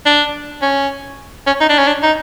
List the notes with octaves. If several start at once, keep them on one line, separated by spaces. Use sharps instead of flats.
D4
C#4
C#4
D#4
D4
C#4
D4
D#4